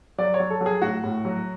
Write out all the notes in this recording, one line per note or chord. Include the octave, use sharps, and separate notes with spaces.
F#3 D5
C#5
F#3
A4
F#3
G#4
A2 F#4
A2
F#3